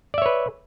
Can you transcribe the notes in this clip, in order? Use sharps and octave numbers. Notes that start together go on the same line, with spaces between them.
B4 C#5 D5 E5